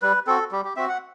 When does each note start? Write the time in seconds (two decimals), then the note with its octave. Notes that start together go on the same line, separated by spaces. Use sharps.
0.02 G3 B4
0.27 C4 F#4 A4
0.51 G3 G4
0.65 G4
0.76 C4 F#4 E5
0.89 F#5